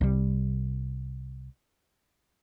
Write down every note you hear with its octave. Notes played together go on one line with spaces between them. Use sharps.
C2 G3